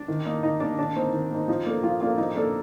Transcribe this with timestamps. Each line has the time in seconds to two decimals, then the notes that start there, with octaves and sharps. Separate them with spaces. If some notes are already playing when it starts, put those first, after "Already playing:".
Already playing: D4
0.08 D#3
0.26 A#3 D#4
0.43 D#3 D#4
0.60 A#3 D4 D#4
0.78 D#3 D4
0.96 A#3 C4 D#4
1.13 D#3
1.30 A#3 D#4
1.48 F3 D#4
1.66 A#3 D4 A4
1.83 F3 F4
2.00 A#3 D4 F4 A4
2.18 F3 D#4
2.36 A#3 D4 A4